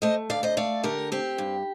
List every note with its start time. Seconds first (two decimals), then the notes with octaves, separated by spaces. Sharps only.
0.02 A3 C5 D#5
0.30 D2 D5 F5
0.43 C5 D#5
0.57 A3 D5 F5
0.83 D3 G4 A#4
1.12 C4 G4
1.38 G2